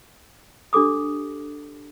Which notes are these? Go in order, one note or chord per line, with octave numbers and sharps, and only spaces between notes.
D4 G4 A4 D6 D#6